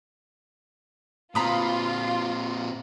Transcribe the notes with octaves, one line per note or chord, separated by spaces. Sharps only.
A#2 C4 F4 A#5 B5 D#6